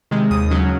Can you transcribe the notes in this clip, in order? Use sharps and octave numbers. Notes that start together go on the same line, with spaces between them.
C3 D#3 G#3
D#2 D#6
C#3 F#3 C#4